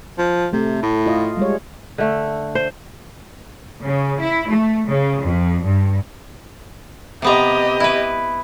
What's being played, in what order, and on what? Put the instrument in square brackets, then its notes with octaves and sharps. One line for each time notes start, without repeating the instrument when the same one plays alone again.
[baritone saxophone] F3
[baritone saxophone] C3 [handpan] A3
[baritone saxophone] A2
[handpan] F4 D#5
G3 G#3 C#5
[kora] D3 A3
C5
[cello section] C#3
E4
A3
C#3
F2
G2
[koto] C3 B3 A#5 [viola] G4 D#5
[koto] E4 B4